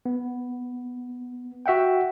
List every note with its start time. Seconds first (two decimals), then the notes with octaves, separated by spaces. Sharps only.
0.06 B3
1.66 F#4 E5 F#5 G5